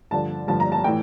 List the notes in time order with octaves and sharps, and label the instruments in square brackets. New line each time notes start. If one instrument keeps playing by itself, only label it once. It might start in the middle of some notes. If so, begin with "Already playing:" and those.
[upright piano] G2 D3 F3 A5
G2 D3 F3 A5
A#5
A5
A2 E3 G5